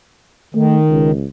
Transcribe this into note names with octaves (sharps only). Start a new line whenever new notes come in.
D#3 A3
C#2